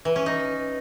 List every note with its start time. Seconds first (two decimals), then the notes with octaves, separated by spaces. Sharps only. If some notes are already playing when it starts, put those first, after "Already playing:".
0.05 E3
0.16 C#4
0.26 D#4